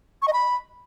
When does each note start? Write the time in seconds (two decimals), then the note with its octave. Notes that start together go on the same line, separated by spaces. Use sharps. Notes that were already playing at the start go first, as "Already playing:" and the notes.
0.22 C#6
0.28 D#5
0.33 B5